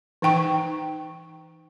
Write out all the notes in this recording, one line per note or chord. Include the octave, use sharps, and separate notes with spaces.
E3 D#4 G5 C#6